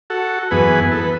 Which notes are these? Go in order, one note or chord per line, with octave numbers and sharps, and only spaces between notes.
F#4 A4
F#2 E3 B3 G#4 B4
A4
B4